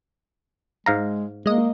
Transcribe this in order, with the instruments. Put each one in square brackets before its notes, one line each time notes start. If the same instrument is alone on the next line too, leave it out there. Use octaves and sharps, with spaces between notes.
[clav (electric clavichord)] G#2 F5 A#5 [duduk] G#3
[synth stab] G#3 D#5 [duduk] A#3